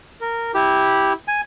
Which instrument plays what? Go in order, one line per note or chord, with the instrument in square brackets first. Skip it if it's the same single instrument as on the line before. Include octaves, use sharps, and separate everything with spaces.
[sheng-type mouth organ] A#4
[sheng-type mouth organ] E4 [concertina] G4
[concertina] G#5